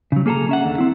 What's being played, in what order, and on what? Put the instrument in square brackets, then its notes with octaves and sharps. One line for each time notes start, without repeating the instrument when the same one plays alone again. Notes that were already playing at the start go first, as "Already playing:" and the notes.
[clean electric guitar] C#3 F#3
A#3 G#4 A4 G5 A#5
C#4 E5 F#5
D#2 D3
C4 E4